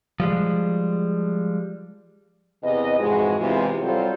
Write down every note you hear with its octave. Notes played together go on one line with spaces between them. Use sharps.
F3 G3 G#3
E2 C3 B4 D#5
F2 G#2 E3 G#3 F#4 G#4
E2 C3 E3 G#3 C4 F4
F#3 G3 C4 F4 A4 C5